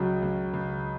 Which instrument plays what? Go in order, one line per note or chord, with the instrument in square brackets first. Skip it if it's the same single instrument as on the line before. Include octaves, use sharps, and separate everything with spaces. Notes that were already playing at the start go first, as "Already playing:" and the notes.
Already playing: [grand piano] C#2 C#3 [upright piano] F#3
[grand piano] C#2
C#2